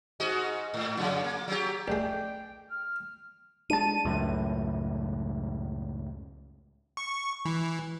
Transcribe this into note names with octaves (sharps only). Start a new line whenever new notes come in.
G#2 F#4 D#5
G#2
F2 C#3
A#3
F#3 G4
A#1 G#3 A3 D5 G5
F6
G#3 D4 A5 D#7
C#2 F#2 A2
C#6
E3